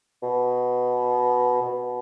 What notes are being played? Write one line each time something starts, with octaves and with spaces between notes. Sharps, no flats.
B2
B2